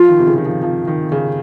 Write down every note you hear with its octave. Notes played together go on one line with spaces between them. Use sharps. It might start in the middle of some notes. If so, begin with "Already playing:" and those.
Already playing: F3 F4
D#3
C3
C#3
D#3
F3
F3
D#3
C#3